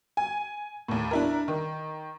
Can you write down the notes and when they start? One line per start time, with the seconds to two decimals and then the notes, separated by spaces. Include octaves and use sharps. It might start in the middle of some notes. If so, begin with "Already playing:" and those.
0.17 G#5
0.88 D#2 A2
1.11 D4 E4 A#4
1.48 D#3